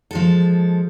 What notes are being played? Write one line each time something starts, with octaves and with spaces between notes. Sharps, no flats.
F3 G#3 A4